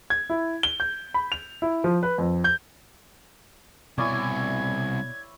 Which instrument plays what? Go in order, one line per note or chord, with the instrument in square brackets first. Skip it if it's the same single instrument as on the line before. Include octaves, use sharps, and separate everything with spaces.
[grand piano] G#6
E4
G7
G6
B5
F7
E4
F3
B4
F2
G6
[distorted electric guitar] C2 G#5 [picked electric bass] B2 [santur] E4 C#5 D5 [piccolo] G#6